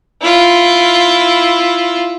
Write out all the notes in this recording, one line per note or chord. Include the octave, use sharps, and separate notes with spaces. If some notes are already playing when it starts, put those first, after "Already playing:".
E4 F4